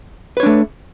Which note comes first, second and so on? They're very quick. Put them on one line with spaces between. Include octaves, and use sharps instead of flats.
B4 C#5 D4 A3